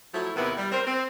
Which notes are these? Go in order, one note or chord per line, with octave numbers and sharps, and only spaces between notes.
F3 F#3 A3 E4
D#2 C3 B3 E4 A#4 F#5
G3
C4 A#4 C5
C4